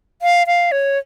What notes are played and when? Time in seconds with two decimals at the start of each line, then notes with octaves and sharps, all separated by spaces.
0.22 F5
0.47 F5
0.71 C#5